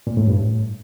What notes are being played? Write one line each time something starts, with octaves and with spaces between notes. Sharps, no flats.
A#2
A2
G2
A2